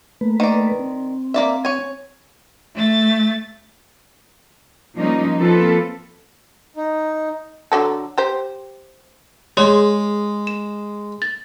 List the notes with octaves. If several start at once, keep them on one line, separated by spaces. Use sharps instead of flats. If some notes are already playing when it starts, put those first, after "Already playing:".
A3 A#3 B4
D#3 D5
C4
A#3 D5 E5
C#5 G#5
A3 A6
F3 G3 A#3 C#4 D#4
F3 A#3 C4 F4 A4 B4
D#4
D3 F#3 A4
G4 C5
G#3 G#4 C#5 C6
E7
A6